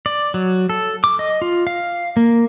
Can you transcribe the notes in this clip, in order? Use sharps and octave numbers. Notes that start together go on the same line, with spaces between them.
D5
F#3
A4
D6
D#5
F4
F5
A#3